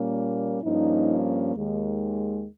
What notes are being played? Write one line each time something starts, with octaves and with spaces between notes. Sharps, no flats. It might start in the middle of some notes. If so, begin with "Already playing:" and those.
Already playing: A#2 G3 A#3 C#4
G2 F3 A#3 C#4 D#4
D#2 D#3 G#3